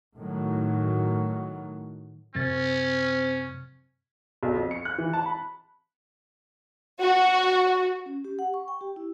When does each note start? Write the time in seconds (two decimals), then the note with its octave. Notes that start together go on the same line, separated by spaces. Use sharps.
0.18 A2 D#3 F#3
2.35 F#2 C3 C4 C#4 A6
4.43 B1
4.55 F2
4.71 C#7
4.85 F#6
4.98 E3
5.13 A5
5.26 B5
7.02 F#4
8.06 C#4
8.25 G4
8.39 F#5
8.54 C#6
8.68 G5
8.81 G4
8.96 E4